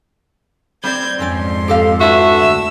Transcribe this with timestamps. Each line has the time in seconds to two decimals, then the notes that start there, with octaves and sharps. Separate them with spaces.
0.84 G3 C4 C5 D5 G6 G#6
1.19 F2 G#2 C4 C#4 D5 C6
1.68 G4 A4 F5
2.01 G#3 D4 F#4 A4 B4 E5
2.35 D2 E6